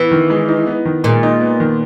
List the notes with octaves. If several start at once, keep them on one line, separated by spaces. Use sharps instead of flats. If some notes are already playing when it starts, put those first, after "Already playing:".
Already playing: E3 B3
D#3
G#3
D#4
B3
D#3
A#2 G#3
D#4
B3
D#3